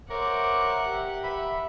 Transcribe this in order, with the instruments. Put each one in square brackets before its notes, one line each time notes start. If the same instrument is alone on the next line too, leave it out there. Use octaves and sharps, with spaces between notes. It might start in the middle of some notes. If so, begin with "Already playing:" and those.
[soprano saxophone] A#4 [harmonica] C5 C#5 D6 [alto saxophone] E5 [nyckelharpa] F#5
[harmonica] G4
[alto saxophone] E5 [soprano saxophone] B5